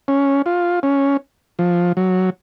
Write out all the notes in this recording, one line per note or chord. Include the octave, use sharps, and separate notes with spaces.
C#4
F4
C#4
F3
F#3